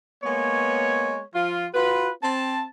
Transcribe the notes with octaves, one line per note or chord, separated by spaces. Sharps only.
G#3 A#3 B3 C#5
F3 F4
F4 F#4 B4
C4 A5